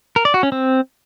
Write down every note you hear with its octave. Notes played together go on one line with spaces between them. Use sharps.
A#4
D5
F#4
C#4
C4